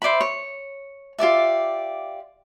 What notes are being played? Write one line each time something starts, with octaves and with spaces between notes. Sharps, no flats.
C5 D5 E5 B5
C#5
F4 G4 D5 E5